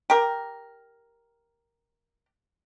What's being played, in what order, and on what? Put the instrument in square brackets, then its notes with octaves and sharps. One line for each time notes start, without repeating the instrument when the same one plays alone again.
[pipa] G4 A#4